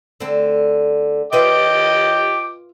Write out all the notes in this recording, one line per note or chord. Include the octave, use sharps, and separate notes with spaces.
D3 A3 C4
F4 B4 D#5 E5 G5 D6